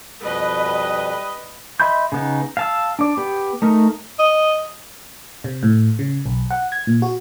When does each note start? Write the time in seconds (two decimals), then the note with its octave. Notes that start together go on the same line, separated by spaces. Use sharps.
0.23 F2 B2 G3 B4 D#5
1.80 D#5 E5 B5 C6 G6
2.12 C#3 B3 D#4
2.57 F5 A5 E6
2.99 D4 D5
3.17 B3 G4
3.62 A3 D#4 A#4
4.19 D#5
5.44 C3
5.63 A2
5.99 C#3
6.26 B1
6.51 F#5
6.72 G#6
6.87 A#2
7.02 F#4